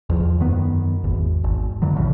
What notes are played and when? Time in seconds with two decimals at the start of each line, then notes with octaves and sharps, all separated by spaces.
0.10 E2 F3
0.40 F#2 D#3 B3
1.04 G#1 E2
1.44 G#1
1.82 F2 D3 E3 F#3
1.96 B1 A2 C#3 F3